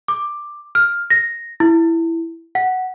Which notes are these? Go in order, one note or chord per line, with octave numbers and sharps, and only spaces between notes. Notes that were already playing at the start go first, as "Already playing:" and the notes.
D6
F6
A#6
E4
F#5